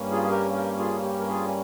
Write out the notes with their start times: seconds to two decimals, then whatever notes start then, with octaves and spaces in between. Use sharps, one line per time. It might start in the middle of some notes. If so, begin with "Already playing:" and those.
Already playing: G2 G3 A#3 C#4
0.11 F4 G#4
0.23 G#4
0.30 G4 A#4
0.54 G4 A#4
0.78 F4 G#4
1.03 G4
1.19 A#4
1.28 F4 G#4
1.48 G#5